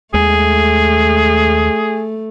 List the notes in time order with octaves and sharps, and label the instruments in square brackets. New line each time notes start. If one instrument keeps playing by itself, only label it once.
[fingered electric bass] D#2 G#3 [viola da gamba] A3 [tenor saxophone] G#4